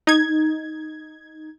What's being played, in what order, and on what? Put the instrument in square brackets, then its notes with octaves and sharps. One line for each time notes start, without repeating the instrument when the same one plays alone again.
[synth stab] D#4 G#6